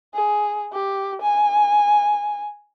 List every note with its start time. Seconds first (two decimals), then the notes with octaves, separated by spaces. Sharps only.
0.14 G#4
0.73 G4
1.22 G#5